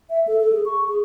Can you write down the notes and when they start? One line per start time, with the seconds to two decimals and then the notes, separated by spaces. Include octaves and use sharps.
0.10 E5
0.27 A4
0.40 A4
0.52 G#4
0.66 C#6
0.89 G#4